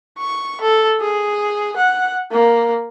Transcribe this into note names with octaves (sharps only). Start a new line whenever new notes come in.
C#6
A4
G#4
F#5
A#3